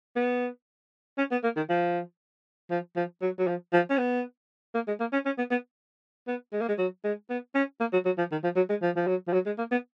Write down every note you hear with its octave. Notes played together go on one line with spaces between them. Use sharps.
B3
C#4
B3
A#3
D#3
F3
F3
F3
F#3
F#3
F3
F3
C#4
B3
A#3
G#3
A#3
C#4
C#4
B3
B3
B3
G#3
A#3
G#3
F#3
G#3
B3
C#4
A#3
F#3
F#3
F3
D#3
F3
F#3
G#3
F3
F3
F#3
F3
F#3
G#3
A#3
B3